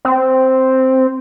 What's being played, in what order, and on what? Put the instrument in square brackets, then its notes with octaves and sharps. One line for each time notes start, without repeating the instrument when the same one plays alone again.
[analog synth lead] C4